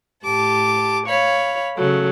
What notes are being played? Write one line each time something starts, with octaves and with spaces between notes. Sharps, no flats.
A2 G4 A5 D6
C#5 F5 B5
C#3 F#3 A3